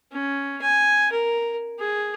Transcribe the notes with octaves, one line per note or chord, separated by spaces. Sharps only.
C#4
G#5
A#4
G#4